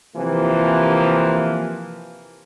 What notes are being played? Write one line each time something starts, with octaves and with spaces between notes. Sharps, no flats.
C3 E3 F3 A#3